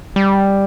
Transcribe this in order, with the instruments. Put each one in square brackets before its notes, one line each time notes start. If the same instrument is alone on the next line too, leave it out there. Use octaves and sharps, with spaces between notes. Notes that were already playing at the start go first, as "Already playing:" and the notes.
[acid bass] G3